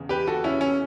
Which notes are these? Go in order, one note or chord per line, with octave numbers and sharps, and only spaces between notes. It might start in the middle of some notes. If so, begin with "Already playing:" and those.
Already playing: E1 E2 C#3
G4 B4
F#4 A4
C#4 E4
C#4